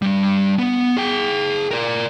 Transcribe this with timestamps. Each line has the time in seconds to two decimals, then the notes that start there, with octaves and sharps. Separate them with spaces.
0.02 G3 D4
0.59 B3
0.97 G#4 G5
1.71 A#4 D5